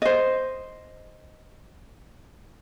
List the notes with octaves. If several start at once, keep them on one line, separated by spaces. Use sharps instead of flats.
C5 D#5